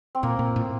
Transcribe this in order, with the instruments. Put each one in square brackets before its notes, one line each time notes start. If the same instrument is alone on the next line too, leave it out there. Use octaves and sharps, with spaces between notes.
[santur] C4
[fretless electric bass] A#2 [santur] A#3
[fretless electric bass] A#2
A2